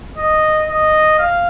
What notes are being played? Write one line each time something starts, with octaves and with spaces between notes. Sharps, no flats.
D#5
D#5
F5